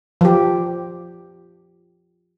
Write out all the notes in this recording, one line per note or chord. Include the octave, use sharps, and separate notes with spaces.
F3 G4